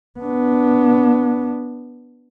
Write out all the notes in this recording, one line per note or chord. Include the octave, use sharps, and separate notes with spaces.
B3 D4